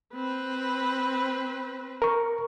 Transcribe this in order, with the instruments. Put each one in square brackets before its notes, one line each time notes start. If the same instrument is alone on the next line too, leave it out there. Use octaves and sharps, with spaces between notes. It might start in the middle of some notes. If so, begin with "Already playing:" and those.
[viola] C4 B4
[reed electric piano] A#4 C#6